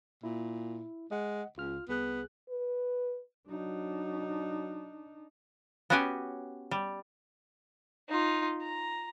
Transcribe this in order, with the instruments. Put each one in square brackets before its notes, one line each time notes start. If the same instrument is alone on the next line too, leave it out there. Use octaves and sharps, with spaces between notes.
[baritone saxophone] A#2 [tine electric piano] E4
[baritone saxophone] G#3 [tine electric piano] D#5 F#5
[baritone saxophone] C#2 [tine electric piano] F4 F6
[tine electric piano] C2 G#4 F#6 [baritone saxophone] B3
[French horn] B4
[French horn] F#3 [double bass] D4 D#4
[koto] B3 C#4 F#4 G4 F#5 G#5
G3
[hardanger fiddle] D#4 F4
A#5